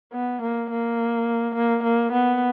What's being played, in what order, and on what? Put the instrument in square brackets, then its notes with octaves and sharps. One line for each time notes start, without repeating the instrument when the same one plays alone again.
[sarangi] B3
A#3
A#3
A#3
A#3
B3